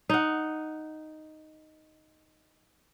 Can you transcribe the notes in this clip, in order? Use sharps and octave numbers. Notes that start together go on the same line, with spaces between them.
D#4 F#5